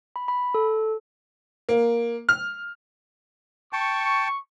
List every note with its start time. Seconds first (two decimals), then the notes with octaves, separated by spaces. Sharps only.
0.16 B5
0.28 B5
0.54 A4
1.69 A#3
2.29 F6
3.73 G5 A5 C#6